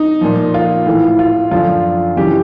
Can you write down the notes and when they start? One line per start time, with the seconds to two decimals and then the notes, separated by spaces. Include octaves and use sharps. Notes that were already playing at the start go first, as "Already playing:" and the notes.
Already playing: D#4
0.21 A#2 F3
0.54 F4
0.86 A2 E3
1.19 F4
1.51 F#2 D3 F3 F4
2.17 F#2 C#3 E3 G4